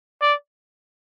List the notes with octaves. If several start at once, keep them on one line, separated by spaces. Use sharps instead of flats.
D5